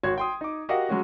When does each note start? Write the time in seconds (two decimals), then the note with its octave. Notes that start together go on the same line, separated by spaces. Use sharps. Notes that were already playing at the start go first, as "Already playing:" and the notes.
0.03 G#1 F#4 C#5 C6 G#6
0.18 G5 C6 D#6
0.41 D#4 D6
0.69 F#4 G4 A#4 D#5 F5 F#5
0.89 F#3 G#3 C#4 F#4